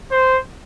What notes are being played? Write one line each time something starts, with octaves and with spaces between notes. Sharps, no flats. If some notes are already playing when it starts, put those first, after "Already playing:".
C5